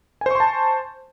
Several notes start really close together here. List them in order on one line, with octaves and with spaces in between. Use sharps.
G#5 C5 C#6 C6 A5